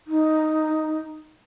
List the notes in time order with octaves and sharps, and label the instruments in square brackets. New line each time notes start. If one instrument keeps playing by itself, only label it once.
[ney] D#4